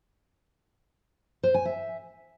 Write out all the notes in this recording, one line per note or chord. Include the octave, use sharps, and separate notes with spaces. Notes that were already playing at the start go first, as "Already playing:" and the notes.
C5
G#5
E5